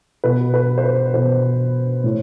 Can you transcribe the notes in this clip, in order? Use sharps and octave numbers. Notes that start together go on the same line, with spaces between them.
B2 B4
B4
C5
B4
B2 C5
A2